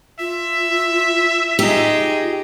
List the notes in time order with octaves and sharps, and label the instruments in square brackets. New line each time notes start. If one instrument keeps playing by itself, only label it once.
[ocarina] F4 [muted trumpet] E5
[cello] D#4 G#4 [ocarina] F4 [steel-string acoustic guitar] G4